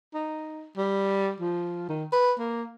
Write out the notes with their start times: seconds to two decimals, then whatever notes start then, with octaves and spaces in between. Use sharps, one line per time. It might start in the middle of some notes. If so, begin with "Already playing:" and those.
0.14 D#4
0.77 G3
1.40 F3
1.89 D#3
2.12 B4
2.39 A#3